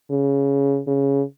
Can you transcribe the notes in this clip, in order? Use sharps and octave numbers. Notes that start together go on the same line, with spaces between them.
C#3
C#3